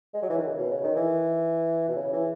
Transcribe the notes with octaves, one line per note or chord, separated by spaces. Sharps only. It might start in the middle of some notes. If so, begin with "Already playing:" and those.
G#3
F#3
E3
D#3
C#3
B2
C#3
D#3
E3
B2
C#3
E3